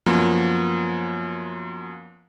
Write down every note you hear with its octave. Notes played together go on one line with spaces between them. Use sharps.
F#2 F3 A#3 B3